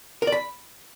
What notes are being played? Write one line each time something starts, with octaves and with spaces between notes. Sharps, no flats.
A#4
D5
B5